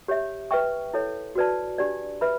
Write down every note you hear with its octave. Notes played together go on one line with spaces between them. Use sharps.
G4 C#5 E5
B4 E5 G5 C#6
E4 A4 C#5
F#4 B4 D5 A5
D4 G4 D5
B4 E5 B5